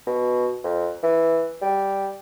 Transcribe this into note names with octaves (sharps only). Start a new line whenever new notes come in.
B2
F2
E3
G3